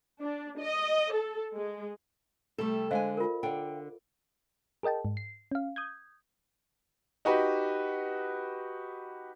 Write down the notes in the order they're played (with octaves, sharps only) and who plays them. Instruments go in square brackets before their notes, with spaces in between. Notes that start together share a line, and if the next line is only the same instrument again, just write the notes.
[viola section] D4
D#5
A4
G#3
[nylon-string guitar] C3 G3 A3 [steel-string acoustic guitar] A4
[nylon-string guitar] D3 G#3 G#5 [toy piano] C5 D#5 F5
[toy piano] F4 A#4
[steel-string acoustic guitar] D3 [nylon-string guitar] D5 F5 G5
[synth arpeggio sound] G#4 A#4 D#5 G5 A5
G#2
C7
C#4 F5
D#6 G6 G#6
[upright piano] D#4 F#4 G4 B4